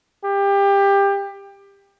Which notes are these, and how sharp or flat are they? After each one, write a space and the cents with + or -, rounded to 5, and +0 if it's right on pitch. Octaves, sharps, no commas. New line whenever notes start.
G4 +25